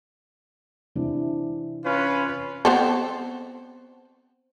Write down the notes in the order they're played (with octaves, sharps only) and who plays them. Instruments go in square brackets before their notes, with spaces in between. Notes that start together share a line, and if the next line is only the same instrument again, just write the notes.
[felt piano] C3 E3 D4
[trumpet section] C#4 F4 B4
[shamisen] B3 C4 A4